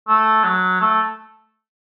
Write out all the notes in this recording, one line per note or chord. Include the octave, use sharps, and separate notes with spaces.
A3
F#3
A3